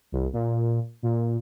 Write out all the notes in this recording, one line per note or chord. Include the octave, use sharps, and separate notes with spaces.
C2
A#2
A#2